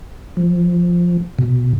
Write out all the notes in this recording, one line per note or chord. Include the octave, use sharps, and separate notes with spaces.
F3
B2